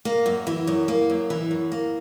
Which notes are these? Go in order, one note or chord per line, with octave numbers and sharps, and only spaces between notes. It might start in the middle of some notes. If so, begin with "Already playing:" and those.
A#3
F#2
E3
F#2
A#3
F#2
E3
F#2
A#3